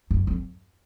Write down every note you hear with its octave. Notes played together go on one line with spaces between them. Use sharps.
F#2
F2